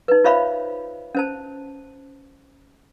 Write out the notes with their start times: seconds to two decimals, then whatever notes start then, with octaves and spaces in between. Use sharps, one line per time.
0.08 D#4 B4
0.24 F4 C5 C#5 E5 F5 B5
1.15 C#4 C5 A5